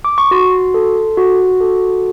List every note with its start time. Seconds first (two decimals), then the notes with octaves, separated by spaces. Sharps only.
0.05 D6
0.18 C#6
0.31 F#4 C6
0.74 A4
1.17 F#4
1.61 A4